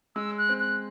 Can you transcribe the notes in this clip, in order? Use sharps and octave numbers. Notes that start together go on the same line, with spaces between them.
G#3 E6
F#6
C4
F#6